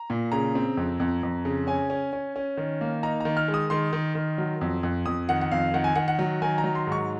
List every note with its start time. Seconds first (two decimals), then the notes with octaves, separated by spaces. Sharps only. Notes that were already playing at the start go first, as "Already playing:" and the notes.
Already playing: A#5
0.10 A#2
0.32 C#3 A#5
0.55 C4
0.77 F2
1.00 F2
1.23 F2
1.45 C#3
1.67 C#4 G#5
1.90 C#4
2.13 C#4
2.36 C#4
2.57 D#3
2.81 A#3
3.03 D#4 A#5
3.20 D#3 A#5
3.37 F6
3.48 G#3
3.54 D#6
3.70 D#3 C6
3.93 D#3
4.15 D#3
4.38 F#3
4.61 F2
4.83 F2
5.06 F2 D#6
5.29 D#3 F#5
5.41 F#5
5.52 F2 F5
5.74 D#3 F#5
5.84 G#5
5.95 D#3 F#5
6.08 F#5
6.19 F#3
6.42 D#3 G#5
6.58 A#5
6.64 F#3
6.75 C6
6.87 G#2 C#6